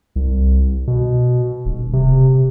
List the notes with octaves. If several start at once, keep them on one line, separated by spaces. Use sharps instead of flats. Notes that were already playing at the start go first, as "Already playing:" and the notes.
C2
B2
D#1
C3